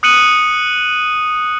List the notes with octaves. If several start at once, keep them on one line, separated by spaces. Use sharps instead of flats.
D#6 F#6 C#7 D#7 F#7